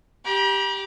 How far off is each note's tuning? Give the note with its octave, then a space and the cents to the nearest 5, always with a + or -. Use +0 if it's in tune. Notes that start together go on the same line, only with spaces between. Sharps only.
G4 +0 A#5 +45